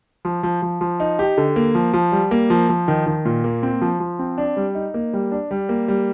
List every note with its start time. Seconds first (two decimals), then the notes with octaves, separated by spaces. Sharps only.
0.25 F3
0.43 F3
0.62 F3
0.81 F3
1.00 D#4
1.19 G4
1.38 D3
1.56 A#3
1.75 F3
1.93 F3
2.12 G3
2.31 A#3
2.50 F3
2.69 F3
2.88 D#3
3.06 D#3
3.25 A#2
3.44 A#3
3.63 C4
3.81 F3
4.00 F3
4.19 C4
4.38 D4
4.57 G3
4.75 D#4
4.94 A#3
5.13 G3
5.32 D4
5.51 G3
5.69 A#3
5.88 G3